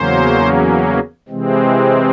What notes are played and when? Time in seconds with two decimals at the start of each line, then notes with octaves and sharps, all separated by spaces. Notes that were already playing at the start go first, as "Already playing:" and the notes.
Already playing: E2 C#3 F#3 A#3 C#4 C5
1.28 C3 E3 G#3 C4